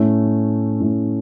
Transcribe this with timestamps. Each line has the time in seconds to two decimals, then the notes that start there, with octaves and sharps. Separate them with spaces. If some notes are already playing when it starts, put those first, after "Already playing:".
Already playing: A2 A3 C#4
0.80 A2 A3 C#4